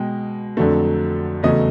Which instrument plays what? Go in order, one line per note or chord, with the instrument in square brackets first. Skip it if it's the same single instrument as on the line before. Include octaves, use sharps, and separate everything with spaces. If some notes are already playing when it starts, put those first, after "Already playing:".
Already playing: [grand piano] B2 G#3 G5
F2 D3 F#3 A3
E2 C#3 F#3 A3 D#5